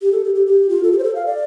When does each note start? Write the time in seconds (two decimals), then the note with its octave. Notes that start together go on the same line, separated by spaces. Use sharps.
0.02 G4
0.12 A4
0.25 G4
0.35 G4
0.47 G4
0.69 F4
0.83 A4
0.92 G4
0.98 C5
1.04 A4
1.15 F5
1.26 D5